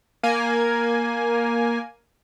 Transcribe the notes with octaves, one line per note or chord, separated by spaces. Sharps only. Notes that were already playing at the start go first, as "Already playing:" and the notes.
A#3 G#5